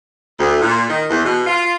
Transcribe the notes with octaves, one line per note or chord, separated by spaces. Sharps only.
D2
A#2
D#3
E2
B2
F4